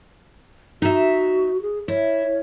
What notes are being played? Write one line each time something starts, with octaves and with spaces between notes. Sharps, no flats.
D#4 F#4 E5
G#4
E4 C#5